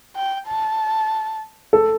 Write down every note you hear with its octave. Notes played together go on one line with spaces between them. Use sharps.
G5
A5
A4